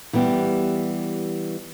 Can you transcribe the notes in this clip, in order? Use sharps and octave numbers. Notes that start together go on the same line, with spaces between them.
E3 G3 B3 G4